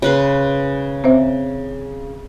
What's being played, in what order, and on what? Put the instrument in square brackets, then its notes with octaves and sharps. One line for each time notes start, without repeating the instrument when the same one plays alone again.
[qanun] C#3 B4 C6
[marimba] C4 C5 E5